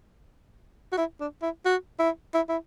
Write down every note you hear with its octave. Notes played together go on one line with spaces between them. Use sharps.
F#4
E4
D4
E4
F#4
E4
E4
E4